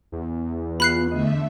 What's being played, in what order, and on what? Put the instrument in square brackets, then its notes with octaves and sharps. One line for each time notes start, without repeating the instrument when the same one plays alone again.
[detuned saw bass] E2
[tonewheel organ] B3 F4 [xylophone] B5 F#6 C7
[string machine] D3 A3 E5 [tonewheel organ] D#5